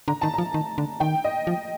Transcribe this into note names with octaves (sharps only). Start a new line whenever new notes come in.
D3 A#5
D#3 A5
F3 A#5
D#3
D3
D#3 G5
D#5
F3